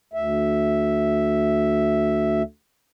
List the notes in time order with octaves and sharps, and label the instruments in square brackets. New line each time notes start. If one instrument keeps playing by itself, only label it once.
[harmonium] D2 E5